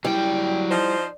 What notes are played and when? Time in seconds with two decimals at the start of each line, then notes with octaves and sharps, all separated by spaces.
0.05 F#3 G3 E4 G5
0.71 F3 D#4 C5